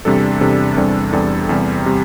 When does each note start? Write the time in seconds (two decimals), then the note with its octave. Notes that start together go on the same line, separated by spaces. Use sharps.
0.05 E2 C3 G3 D4 A4
0.41 E2 C3 G3 D4 A4
0.77 E2 C3 G3 D4 A4
1.13 E2 C3 G3 D4 A4
1.49 E2 C3 G3
1.86 C3 G3